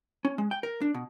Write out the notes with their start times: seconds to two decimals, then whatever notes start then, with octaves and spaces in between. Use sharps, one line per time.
0.25 C#4
0.38 G#3
0.51 G5
0.63 A#4
0.81 D4
0.94 B2